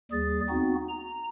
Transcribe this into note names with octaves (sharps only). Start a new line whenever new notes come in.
D#2 G3 G#4 A6
B3 C4 D#4 F#4
A#5